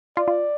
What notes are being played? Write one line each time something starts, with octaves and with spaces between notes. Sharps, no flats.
F4 D5
F4